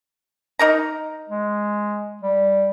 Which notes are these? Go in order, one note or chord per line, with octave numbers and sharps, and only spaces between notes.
D#4 A#4 A#5
G#3
G3